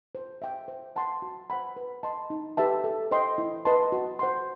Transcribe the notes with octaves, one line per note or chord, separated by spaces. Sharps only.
C5
E5 G5
C5
F#5 A5 C6
F#4
C5 F#5 B5
B4
D#5 A5 C6
D#4
G4 B4 E5 A5
A4
C5 D#5 G5 C6
E4
B4 D#5 A5 C6
F#4
C5 F#5 C6